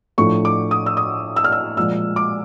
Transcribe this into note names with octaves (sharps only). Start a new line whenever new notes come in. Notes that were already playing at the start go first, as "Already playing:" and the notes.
A2 F3 A3 D4 C#6
D6
D#6
E6
D#6
E6
F6
E6
A#2 F3 G#3 E6
D6